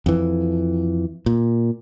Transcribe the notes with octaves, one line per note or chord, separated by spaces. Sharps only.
F2 E3
A#2